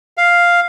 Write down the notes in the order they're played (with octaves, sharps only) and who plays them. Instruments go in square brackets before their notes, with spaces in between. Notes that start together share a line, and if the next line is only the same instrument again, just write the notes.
[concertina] F5